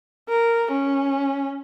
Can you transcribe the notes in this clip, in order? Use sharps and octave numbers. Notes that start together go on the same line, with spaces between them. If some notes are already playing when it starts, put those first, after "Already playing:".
A#4
C#4